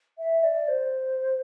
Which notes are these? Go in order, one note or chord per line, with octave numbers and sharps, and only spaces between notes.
E5
D5
C5